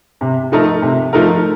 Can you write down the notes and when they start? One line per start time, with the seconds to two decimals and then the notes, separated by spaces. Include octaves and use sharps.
0.21 C3
0.52 F3 A3 D#4 A#4
0.82 C3
1.13 F3 A3 D#4 A#4